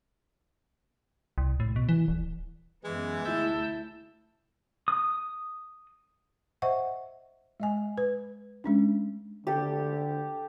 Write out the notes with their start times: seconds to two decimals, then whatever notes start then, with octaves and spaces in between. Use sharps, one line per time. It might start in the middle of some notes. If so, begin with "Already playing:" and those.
1.38 C2
1.60 A2
1.76 B2
1.89 E3
2.08 D1
2.84 F#2 E3 G#3 B3
3.25 D2 E4 A5 E6 G6
4.88 D#6
6.62 C5 D#5 E5 F#5 C#6
7.60 G#3 D#5 G#5
7.98 B4
8.64 G#3 C#4 D4
9.47 D3 G4 A4